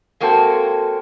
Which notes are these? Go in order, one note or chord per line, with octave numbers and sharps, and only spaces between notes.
G#3 A#3 C4 F#4 A4